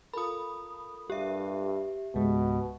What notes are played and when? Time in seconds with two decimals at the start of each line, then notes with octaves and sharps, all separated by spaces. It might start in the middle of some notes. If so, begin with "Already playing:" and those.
0.14 F4 A4 A#4 B5 D#6
1.10 G2 G4 E5
2.15 C#2 G#2 B2 G#3